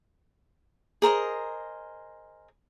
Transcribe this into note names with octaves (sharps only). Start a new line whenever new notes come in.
G#4 A#4 C5 D#5